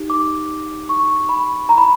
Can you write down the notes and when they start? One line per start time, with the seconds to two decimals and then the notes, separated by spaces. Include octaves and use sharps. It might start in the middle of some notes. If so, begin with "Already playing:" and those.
Already playing: D#4 G4
0.10 D6
0.89 C#6
1.29 B5
1.69 A#5
1.78 B5